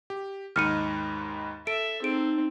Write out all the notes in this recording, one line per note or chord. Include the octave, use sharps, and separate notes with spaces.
G4
D#2 G#2 D#4 B5 F6 C#7 D#7
A4 E5 D7
C4 D#4 G#4 D7